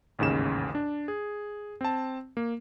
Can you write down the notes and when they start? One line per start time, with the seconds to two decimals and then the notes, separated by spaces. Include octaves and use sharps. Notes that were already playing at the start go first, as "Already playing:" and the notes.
0.19 A1 D#2 G#2 C#3 E7
0.75 D4
1.08 G#4
1.81 C4 A5
2.37 A#3